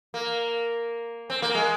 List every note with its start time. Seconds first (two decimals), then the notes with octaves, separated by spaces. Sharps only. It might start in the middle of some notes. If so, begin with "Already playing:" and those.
0.14 A#3
1.30 C4
1.42 A#3
1.55 G#3